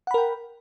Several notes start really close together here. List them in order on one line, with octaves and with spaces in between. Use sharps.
F#5 B5 A#4 G5